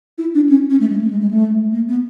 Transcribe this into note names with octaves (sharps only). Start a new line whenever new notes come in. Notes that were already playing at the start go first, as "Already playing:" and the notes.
E4
D4
C#4
C#4
A3
G#3
A3
G#3
G#3
A3
A#3
B3